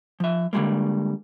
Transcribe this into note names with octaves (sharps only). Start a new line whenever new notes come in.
F3 E5
D3 F3 G3 G#3 A#3